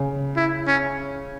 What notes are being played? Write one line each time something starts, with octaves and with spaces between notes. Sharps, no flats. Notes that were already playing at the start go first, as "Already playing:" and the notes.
Already playing: C#3
E4
C#4